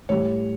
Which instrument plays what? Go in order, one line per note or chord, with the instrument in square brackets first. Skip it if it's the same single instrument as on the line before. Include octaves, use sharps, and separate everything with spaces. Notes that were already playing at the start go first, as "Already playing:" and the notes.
[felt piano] A2 G3 C#5